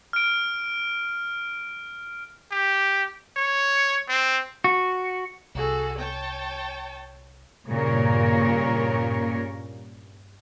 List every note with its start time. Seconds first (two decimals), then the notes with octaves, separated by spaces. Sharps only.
0.13 F6 D7
2.52 G4
3.37 C#5
4.09 C4
4.64 F#4
5.55 C2 F#4 G#4 A4
5.98 C#5 G5 A5
7.70 G2 A#2 C#3 A#3 A#4 C#5